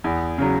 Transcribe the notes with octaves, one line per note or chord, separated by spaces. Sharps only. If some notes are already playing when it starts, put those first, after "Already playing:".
E2
C#3 F#3